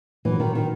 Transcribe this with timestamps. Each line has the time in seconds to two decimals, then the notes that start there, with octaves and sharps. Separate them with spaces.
0.25 A#2 E3 F#3 A#3 D4
0.40 D#3
0.55 D#3